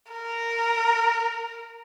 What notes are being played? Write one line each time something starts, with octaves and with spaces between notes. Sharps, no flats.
A#4